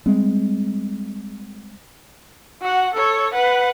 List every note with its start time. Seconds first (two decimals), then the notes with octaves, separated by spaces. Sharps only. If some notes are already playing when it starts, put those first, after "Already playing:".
0.06 G3 G#3 C4
2.61 F#4 F#5
2.94 A4 C#5
3.34 B4 F#5